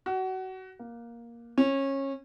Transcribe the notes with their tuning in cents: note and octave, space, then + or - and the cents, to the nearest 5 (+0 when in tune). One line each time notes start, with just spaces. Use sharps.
F#4 +25
A#3 +10
C#4 -25